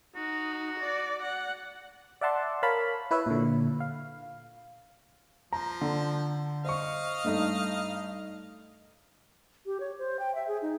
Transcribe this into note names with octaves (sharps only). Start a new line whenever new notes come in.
D#4 F#4
D5
F#5
D5 E5 F#5 A5 C6
A#4 C#5 F5 A5 B5
E4 B4 C#5 E5
A#2 D3
F5
F3 A#5
D3
C5 D#5 F5 C#6
G2 A3 D#4
G4
C#5
C5
G5
E5
G#4
D#4